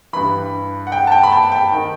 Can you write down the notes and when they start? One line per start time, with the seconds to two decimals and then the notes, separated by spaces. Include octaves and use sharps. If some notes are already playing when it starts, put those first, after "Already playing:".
0.13 G2 E3 B5
0.87 F#5
0.92 G5
1.07 A5
1.12 G5
1.23 B5
1.32 A5
1.52 G5
1.72 D#3